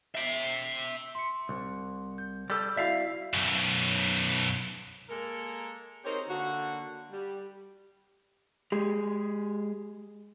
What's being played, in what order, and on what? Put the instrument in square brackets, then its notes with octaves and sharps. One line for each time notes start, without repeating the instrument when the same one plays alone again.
[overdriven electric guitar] E5 G5
[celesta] C6 C#7
[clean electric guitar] C2
[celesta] G6
[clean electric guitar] G3 A4
[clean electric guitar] C2 E5 F5 [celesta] E4 F#4 D5
[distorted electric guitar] B1 F#2
[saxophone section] G#3 A#3 A4 A#4
C4 D#4 G4 G#4 A#4 C#5
D3 A#3 F#4
G3
[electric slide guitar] G#3 G4 G#4